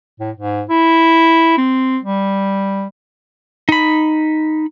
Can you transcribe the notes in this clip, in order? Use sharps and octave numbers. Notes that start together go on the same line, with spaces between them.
A2
G#2
E4
C4
G3
D#4 B5